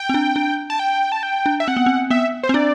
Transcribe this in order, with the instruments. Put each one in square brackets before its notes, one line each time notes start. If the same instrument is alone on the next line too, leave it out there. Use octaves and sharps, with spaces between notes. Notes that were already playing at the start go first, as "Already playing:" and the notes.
Already playing: [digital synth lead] G5
[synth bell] C4
D4
D4
[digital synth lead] A5
G5
A5
G5
[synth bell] D4
[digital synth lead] E5
[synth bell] C4 [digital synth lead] F#5
[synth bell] B3
C4
[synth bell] B3 [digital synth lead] E5
[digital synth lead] C5
[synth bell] C4
[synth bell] D4 [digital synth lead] D5